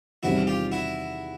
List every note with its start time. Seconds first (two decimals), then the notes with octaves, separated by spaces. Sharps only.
0.23 E2 C3 D#3 G3 C4 E4 F#4
0.47 F4 G4
0.72 E4 F#4